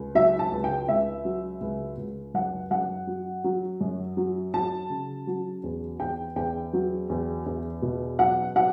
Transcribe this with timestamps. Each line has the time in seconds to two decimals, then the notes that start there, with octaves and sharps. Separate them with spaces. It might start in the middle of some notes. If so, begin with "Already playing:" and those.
Already playing: C#2
0.15 F#3 E5
0.39 A5
0.52 C#2
0.64 G5
0.88 C#2 E5
1.25 F#3
1.61 C#2
1.98 C#2
2.34 F#2 F#5
2.71 F#2 F#5
3.07 F#3
3.44 F#3
3.81 F#2
4.17 F#3
4.54 F#3 A5
4.90 C#3
5.27 F#3
5.64 E2
6.00 E2 G5
6.36 E2 G5
6.73 F#3
7.10 E2
7.46 E2
7.82 B2
8.19 F#3 F#5
8.56 F#3 F#5